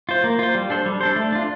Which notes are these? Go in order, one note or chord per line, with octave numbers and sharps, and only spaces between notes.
F4 C5
A#3
F4 C5
G3
D4 A4 C5
G3
D4 A4 C5
A3
D4 F4